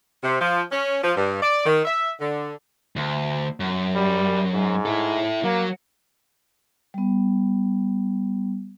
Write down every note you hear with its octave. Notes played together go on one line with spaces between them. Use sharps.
C3
F3
C#4
F3
G2
D5
D#3
E5
D3
D2
F#2
G3
G#2
E4 A4
F#3 A#3
G3 B3